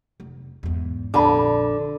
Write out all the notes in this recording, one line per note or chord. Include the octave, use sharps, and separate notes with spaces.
F1
E2 G#2
A#1 F2 D3 D4 A5 B5